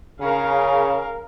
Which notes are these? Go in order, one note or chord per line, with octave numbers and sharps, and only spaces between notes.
C#3 A#4 F5